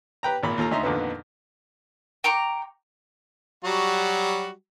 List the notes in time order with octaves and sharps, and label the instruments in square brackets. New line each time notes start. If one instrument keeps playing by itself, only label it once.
[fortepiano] G4 B4 G5 A#5
G#1 A#2 B5
D#2 F4 A4 A#5
D2 D#4 E5 A#5 C6
F2 A#2 D3 D#3 A#3 B3
[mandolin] G5 A#5 C#6 D6
[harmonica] F#3 G3 F#4